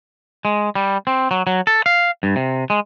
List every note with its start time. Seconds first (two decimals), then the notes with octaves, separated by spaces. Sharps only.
0.45 G#3
0.75 G3
1.07 C4
1.31 F#3
1.47 F#3
1.67 A4
1.86 F5
2.23 G2
2.36 C3
2.70 G#3